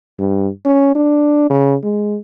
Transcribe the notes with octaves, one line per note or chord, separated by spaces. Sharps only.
G2
C#4
D4
C#3
G#3